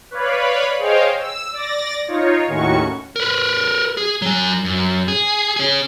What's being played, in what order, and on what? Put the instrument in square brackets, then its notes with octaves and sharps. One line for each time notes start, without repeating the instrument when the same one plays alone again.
[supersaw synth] B4 C#5 D5 F5 B5
G#4 C5 C#5 D#5 F5 G5
E6
D5 A6 A#6
D#4 F4 C#5
D#2 A2 D#3 C#4 F#4 C#6
[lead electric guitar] A#4 B4
G#4
F#3 G#5
F#2
G#4
C#4 G#4